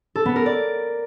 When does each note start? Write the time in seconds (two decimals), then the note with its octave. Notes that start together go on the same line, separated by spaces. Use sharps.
0.15 A4
0.26 B3
0.36 A#4
0.46 D5